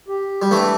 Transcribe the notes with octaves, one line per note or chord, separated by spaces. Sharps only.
G4
G3
E3 A3 D4